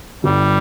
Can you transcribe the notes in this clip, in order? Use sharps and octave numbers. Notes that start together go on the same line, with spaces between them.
G1 G3